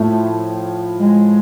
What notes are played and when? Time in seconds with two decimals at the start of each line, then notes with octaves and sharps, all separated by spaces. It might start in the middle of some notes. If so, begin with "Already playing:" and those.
Already playing: A2 F3 A3
1.00 G#3